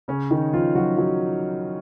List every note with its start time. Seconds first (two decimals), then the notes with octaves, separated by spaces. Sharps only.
0.08 C#3 C#4
0.31 D#3 D#4
0.53 F3 F4
0.75 F#3 F#4
0.98 F#3 F#4